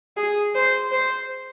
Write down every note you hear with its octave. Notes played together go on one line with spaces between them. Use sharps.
G#4
C5
C5